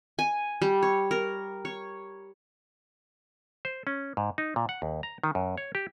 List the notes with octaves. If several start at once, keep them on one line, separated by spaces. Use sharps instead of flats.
G#5
G3
C#5
A#4
C#5
C5
C#4
G#2
D#4
A#2
F#5
D#2
A#5
D#3
F#2
C#5
G4